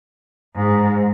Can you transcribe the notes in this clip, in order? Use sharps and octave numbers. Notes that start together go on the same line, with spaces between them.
G#2